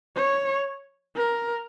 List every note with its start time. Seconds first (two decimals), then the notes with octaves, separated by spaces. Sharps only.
0.16 C#5
1.16 A#4